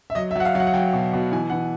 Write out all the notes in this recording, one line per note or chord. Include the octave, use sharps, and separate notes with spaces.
E5
F#3 D#5
E5
F#3 F#5
F5
F#3 F#5
F#5
F#3 G5
B2
B2
E3 G#5
E3 F#5